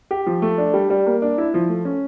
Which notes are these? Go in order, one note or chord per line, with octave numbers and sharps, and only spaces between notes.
G4
F3
A3
D4
G3
G3
A#3
D4
E4
F3
A3
C#4